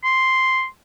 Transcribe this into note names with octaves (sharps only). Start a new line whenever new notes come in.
C6